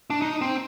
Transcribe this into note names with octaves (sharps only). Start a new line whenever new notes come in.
D4
D#4
C4